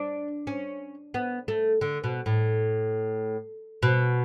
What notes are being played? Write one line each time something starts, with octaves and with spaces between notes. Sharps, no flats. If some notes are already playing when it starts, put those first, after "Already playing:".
Already playing: D4
C#4
B3
A3
D3
B2
A2
B2